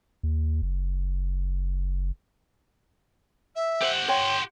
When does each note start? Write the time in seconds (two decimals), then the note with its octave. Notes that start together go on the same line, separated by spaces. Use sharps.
0.23 D#2
0.62 F#1
3.55 E5
3.82 G4 C5 F#5
4.08 C#5 G5 C6